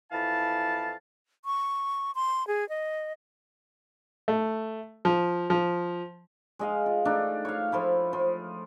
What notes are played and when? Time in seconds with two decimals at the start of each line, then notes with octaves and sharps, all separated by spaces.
0.12 F2 E3 E4 F5 A5
1.45 C#6
2.15 C6
2.47 G#4
2.69 D#5
4.28 A3
5.05 F3
5.50 F3
6.59 G#3 D#5 F5
6.86 F4
7.05 A3 D4 D#4
7.45 C#5 F5
7.72 F3 A3 E4
8.13 F3